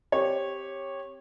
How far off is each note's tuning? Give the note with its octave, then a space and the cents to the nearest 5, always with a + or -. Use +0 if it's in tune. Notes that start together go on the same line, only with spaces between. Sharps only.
C4 +0 G4 +0 C#5 -15